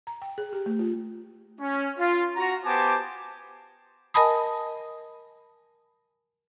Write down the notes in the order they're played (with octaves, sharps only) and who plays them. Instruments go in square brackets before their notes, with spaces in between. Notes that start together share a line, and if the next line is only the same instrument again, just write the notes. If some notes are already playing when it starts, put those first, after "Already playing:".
[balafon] A#5
G5
G#4
G4
A3
F4
[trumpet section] C#4
F4
F#4 A#5
B3 G4 C5 G#5 A5 D6
[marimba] A#4 D#5 G#5 A5 B5 D#6